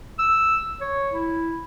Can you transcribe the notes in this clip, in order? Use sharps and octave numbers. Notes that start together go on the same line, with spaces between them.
E6
C#5
E4